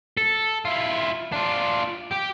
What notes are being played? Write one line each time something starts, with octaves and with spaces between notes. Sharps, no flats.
A4
E4 F4
D4 F4
G4